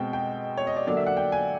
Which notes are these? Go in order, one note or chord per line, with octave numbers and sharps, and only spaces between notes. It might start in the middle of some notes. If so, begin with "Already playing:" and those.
Already playing: B2 G#3 C4 G5
G5
C#5
D#5
D5
D3 F#3 A#3 D4 D5
E5
F#5
G5
G#5